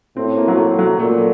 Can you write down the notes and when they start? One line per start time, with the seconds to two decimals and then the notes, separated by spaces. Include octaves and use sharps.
0.17 A2 C4
0.37 A#3
0.48 F#3
0.57 A3
0.79 F#3
0.99 A#2 A3